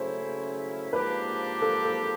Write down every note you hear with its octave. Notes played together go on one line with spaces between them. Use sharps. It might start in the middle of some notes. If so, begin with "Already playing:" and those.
Already playing: C#3 F#3 A3 C#4 E4 C5
G#2 F3 A#3 D4 G4 B4
A4
A4